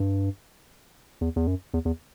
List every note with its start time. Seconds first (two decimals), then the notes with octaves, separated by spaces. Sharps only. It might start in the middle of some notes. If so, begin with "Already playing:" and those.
Already playing: G2
1.21 E2
1.36 E2
1.47 F#2
1.74 E2
1.85 E2